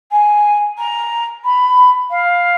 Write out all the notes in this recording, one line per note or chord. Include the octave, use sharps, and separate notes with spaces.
G#5
A#5
B5
F5